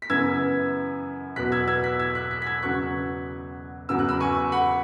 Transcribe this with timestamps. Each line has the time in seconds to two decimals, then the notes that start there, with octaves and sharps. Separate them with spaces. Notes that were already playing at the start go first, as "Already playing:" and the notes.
0.02 B6
0.10 F#2 C#3 E3 B3 E6 G#6
1.36 E2 B2 F#3 B3 F#6 B6
1.52 E6 G#6
1.68 E6 G#6
1.83 F#6 B6
1.99 E6 G#6
2.15 F#6 B6
2.31 F#6 B6
2.42 B6
2.47 E6 G#6
2.63 E2 C#3 F#3 B3 C#6 F#6
3.89 E2 C#3 F#3 B3 E6
3.99 F#6
4.09 B5 E6
4.20 G#5 C#6
4.52 F#5 B5